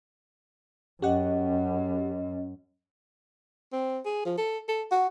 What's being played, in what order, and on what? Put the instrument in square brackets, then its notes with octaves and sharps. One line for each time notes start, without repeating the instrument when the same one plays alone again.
[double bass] F#2 [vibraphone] C#4 D#5 [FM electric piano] G4 F#5
[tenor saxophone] C4
G#4
F3
A4
A4
F#4